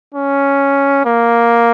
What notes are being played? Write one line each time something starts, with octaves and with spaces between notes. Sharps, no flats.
C#4
A#3